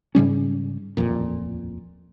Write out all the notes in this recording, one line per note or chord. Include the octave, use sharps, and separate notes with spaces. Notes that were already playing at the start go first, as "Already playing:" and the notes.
G#2 C#3 G3 C#4
D#1 A1 F2 A#2